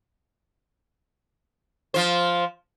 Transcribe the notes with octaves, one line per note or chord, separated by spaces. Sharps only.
F3 C5